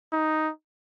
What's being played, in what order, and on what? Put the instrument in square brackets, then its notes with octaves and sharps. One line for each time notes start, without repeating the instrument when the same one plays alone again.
[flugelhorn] D#4